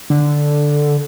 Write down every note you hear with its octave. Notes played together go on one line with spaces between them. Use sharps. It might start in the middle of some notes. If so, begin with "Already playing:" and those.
D3